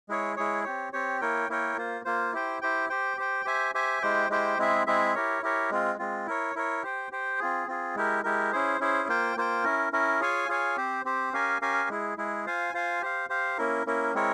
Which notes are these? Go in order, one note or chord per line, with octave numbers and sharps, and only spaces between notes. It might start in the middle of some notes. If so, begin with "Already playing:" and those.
G#3 E4 G#4 C#5
G#3 E4 G#4 C#5
C4 G4 C#5
C4 G4 C#5
A#3 E4 A#4 C#5 G5
A#3 E4 A#4 C#5 G5
A#3 F4 C5
A#3 F4 C5
E4 G4 C5 G5
E4 G4 C5 G5
G4 C5 G5
G4 C5 G5
G4 C5 E5 G#5
G4 C5 E5 G#5
G#3 E4 G4 C5 G5
G#3 E4 G4 C5 G5
G#3 C4 E4 G#4 E5
G#3 C4 E4 G#4 E5
E4 G4 A#4 C#5
E4 G4 A#4 C#5
G#3 C4 F4
G#3 C4 F4
E4 A#4 C#5
E4 A#4 C#5
G4 C5 G5
G4 C5 G5
C4 F4 G#4
C4 F4 G#4
G#3 E4 G4 A#4
G#3 E4 G4 A#4
C#4 E4 G#4 C5
C#4 E4 G#4 C5
A#3 F4 C5 G5
A#3 F4 C5 G5
C#4 E4 A#4
C#4 E4 A#4
F4 G#4 C#5 F5 G#5
F4 G#4 C#5 F5 G#5
C4 G4 C5
C4 G4 C5
C#4 G4 A#4 F5 G#5
C#4 G4 A#4 F5 G#5
G#3 E4 G#4
G#3 E4 G#4
F4 C5 F5 G#5
F4 C5 F5 G#5
G4 C5 F5
G4 C5 F5
A#3 C#4 E4 A#4
A#3 C#4 E4 A#4
G#3 C4 E4 A#4 C#5